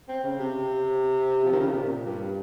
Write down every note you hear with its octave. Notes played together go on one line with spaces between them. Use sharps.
C4
C#3
C3
F3
D#3
C#3
C3
A#2
G2